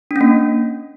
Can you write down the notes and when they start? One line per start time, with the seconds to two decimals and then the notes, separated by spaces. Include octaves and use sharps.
0.11 D4
0.16 C#4
0.21 A#3